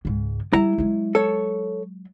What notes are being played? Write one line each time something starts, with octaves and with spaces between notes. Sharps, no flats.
C#2 G#2
G3 E4 A#5
F#3 G#3
A4 C#5